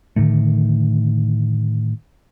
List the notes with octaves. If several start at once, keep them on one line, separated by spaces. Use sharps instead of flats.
A2 D3 D#3 A3